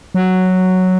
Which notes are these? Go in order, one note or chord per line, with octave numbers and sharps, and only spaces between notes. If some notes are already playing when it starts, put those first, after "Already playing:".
F#3